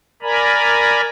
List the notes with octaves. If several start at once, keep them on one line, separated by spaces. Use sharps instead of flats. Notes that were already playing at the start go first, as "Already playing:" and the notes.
A#4 D5 G#5 A#5 B5